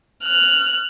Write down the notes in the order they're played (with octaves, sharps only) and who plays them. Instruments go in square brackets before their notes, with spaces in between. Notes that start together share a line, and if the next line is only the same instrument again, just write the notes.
[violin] F6 F#6